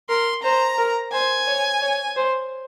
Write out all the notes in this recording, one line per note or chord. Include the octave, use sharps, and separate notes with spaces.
A#4 C6
C5 A#5
A#4
C5 G#5
C#5
C#5
C5